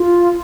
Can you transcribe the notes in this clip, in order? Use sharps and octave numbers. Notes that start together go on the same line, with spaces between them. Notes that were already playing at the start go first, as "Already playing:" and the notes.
Already playing: F4